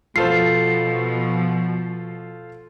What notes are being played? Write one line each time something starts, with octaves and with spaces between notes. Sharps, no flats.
B2 F3 F4 A4 C5 C7